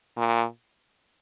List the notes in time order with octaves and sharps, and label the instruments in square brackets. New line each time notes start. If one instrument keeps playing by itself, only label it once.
[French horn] A#2